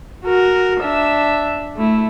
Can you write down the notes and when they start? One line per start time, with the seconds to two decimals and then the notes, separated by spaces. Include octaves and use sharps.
0.25 F#4 A#4
0.81 D4 E5
1.76 A3 E4